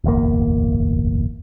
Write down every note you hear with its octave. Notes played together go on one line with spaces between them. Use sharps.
D1 G1 E2 A#3